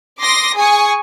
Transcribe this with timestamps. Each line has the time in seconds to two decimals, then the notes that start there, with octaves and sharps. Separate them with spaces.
0.20 C6 D6 D#6 A#6
0.57 G#4 G#5 C#6 D#6